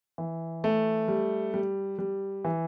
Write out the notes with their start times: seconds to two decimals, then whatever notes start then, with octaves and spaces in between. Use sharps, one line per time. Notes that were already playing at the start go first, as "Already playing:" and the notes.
0.18 E3
0.64 A3
1.08 G3
1.54 G3
1.99 G3
2.45 E3